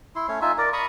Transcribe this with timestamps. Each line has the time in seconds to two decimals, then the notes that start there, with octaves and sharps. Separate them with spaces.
0.16 E4 C6
0.28 A3 C#4 C#5
0.42 D#4 F4 E5 G#5
0.58 A#4 D5
0.73 A#5 B5 C#6 D#6